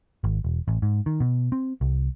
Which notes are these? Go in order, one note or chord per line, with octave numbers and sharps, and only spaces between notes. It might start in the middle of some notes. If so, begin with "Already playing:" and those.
G#1
E1
A1
G#2
D#3
B2
C4
C2